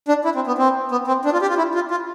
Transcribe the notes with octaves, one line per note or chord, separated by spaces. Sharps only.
D4
E4
C4
B3
C4
B3
C4
D4
F4
G4
F4
E4
F4
F4